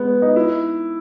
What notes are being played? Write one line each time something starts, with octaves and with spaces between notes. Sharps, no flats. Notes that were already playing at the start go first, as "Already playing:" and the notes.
Already playing: G#3 B3
D#4
E4